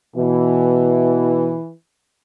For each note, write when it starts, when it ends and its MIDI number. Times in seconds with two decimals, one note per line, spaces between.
0.16 1.57 47
0.16 1.72 52